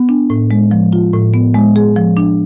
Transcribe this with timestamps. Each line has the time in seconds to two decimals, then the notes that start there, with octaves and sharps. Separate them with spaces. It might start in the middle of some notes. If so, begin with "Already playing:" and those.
Already playing: B3
0.09 D4
0.30 A2
0.51 G#3
0.71 F3
0.93 F4
1.13 A2
1.34 B3
1.54 G#3
1.76 G#4
1.96 F3
2.17 D4